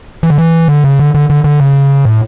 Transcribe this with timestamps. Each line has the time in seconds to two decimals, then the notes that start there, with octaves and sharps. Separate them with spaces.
0.23 E3
0.30 D3
0.38 E3
0.68 D3
0.84 C#3
0.99 D3
1.15 D3
1.30 D3
1.44 D3
1.60 C#3
2.05 A2